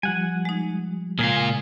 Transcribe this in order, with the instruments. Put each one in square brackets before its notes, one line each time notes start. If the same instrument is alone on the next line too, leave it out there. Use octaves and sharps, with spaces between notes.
[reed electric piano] F3 G3 [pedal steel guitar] F#5 G#5
[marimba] G#3 D#4
[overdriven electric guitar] A#2 F4 [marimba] C#3 G#3 [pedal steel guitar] G#4 G#5